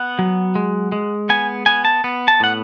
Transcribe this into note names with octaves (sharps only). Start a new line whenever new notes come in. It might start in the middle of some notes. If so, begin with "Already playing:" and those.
Already playing: B3 F#5
F#3
G#3
G#3
B3 G#5
B3 G#5
A5
B3
A5
A2 F#5